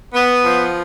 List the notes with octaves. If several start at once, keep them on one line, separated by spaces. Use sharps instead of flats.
B3
F3